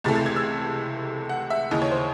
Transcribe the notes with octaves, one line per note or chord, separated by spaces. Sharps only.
C#2 C3 E3 A3 A6
A6
G#6
E6
F#5
E5
D#2 C#3 E3 D#5
C#5
C5